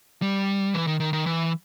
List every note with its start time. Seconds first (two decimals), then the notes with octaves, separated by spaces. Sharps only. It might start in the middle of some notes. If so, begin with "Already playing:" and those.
0.22 G3
0.74 E3
0.87 D#3
1.00 D#3
1.13 D#3
1.26 E3